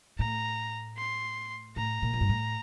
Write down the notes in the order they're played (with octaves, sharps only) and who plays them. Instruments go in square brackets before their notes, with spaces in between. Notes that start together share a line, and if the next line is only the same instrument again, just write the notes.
[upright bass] A2 [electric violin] A#5
[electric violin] C6
[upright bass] A2 [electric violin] A#5
[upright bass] A#2
F2
G2
A2